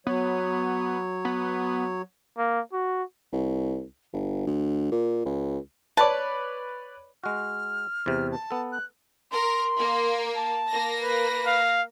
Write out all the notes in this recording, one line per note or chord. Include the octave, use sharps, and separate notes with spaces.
F#3 B3 C#5
B3
A#3
F#4
C2
G1
D2
A#2
C#2
B4 C#5 D5 A5
G#3 F#4 F6
E2 C3
A5
B3 A4
F#6
A#4 C6
A#3
A5
A#3 A#6
B4
F5